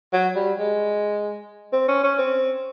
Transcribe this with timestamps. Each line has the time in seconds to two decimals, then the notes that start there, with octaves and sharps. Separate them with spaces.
0.13 F#3
0.36 G3
0.59 G#3
1.73 C4
1.88 C#4
2.04 C#4
2.19 C4